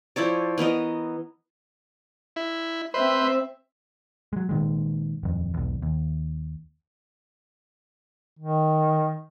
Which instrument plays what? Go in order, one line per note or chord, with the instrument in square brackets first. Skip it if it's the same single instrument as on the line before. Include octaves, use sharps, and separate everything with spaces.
[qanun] F3 E4 C#5 D5
E3 B3 A#4 D#5
[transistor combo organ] E4
[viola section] C4 E5 [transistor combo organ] B4 C5
[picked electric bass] F#3 G#3
A#2 D#3 G#3
D#1 F2
B1 E2
D#2
[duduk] D#3